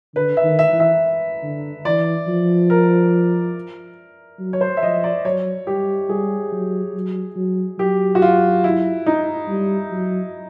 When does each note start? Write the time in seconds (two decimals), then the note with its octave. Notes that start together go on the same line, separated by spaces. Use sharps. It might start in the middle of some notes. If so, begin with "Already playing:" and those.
0.15 D3 B4
0.37 E5
0.44 D#3
0.59 E5
0.73 E3
0.80 E5
1.43 D3
1.85 E3 D5
2.28 F3
2.70 A#4
4.39 F#3
4.53 C#5
4.61 C5
4.77 E5
4.82 F3 D#5
5.04 D5
5.25 F#3 C#5
5.67 G3 G4
6.09 G3 G#4
6.53 F#3
6.94 F#3
7.36 F#3
7.79 F#3 G4
8.15 F#4
8.22 F4
8.64 E4
9.06 D#4
9.48 G3
9.91 F#3